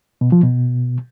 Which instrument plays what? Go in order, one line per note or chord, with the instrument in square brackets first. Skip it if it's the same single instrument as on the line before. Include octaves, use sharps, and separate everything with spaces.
[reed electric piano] B2
F3
B2